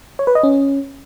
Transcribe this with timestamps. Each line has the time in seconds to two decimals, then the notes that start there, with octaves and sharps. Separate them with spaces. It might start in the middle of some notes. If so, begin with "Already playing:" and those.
0.19 C#5
0.27 B4
0.35 D#5
0.43 C#4